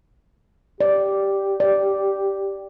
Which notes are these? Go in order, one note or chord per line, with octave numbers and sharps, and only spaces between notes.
G4 D5
D5